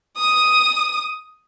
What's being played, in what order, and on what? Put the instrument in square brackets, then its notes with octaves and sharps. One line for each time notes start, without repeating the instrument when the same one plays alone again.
[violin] D#6